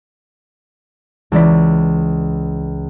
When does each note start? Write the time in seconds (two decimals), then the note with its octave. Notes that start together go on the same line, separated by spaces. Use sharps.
1.32 C#2 E3 D5 B6